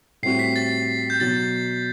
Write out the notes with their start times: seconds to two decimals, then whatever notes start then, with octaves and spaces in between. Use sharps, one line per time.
0.23 A2 G3 C4 F#4 C7
0.39 B6
0.56 A6
1.10 G6
1.20 B2 F#3 A6